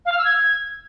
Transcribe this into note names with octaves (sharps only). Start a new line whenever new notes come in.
F5
F6
E6
G#6